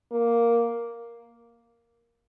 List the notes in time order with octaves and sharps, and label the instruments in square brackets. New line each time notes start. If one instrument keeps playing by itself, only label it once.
[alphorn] A#3